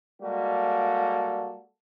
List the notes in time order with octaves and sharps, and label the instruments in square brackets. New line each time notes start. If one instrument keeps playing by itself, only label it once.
[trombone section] G3 G#3 A#3 F#4 A4